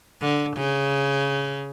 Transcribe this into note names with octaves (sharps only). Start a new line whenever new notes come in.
D3
C#3